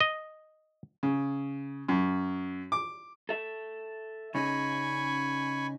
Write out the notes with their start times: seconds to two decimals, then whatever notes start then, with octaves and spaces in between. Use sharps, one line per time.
0.01 D#5
1.03 C#3
1.89 F#2
2.72 D6
3.29 A4 E5
4.35 C#3 C#4 D#4 G#5 B5 C#6